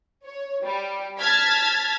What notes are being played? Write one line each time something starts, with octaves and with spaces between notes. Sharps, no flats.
C#5
G3
A5 F6 G#6 A6 B6